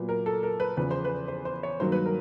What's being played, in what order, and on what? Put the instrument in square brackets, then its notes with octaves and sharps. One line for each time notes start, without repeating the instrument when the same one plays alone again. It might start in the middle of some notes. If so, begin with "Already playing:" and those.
Already playing: [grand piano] A#2 F#3 B3
A#4
A4
A#4
B4
E2 C#3 F3 B4
C5
B4
C5
C5
C#5
G2 D#3 F#3 A#3 C5
B4
A#4